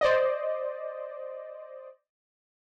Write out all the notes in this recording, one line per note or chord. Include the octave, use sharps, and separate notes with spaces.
C5 D5 D#5